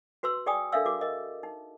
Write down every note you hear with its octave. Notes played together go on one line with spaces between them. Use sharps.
F#4 B4 C6 E6
G#4 D5 G5 G#5 D#6
D4 A4 A#4 E5 F5 E6
F#4 G#4 A#4 D6
A#4 D#5
D#4